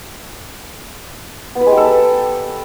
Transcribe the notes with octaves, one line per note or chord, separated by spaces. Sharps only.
B3
B4
G#3
G4
A4